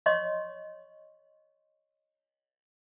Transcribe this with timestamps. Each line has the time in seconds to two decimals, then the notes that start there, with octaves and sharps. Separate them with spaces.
0.06 C#5 D#5 C6 C#6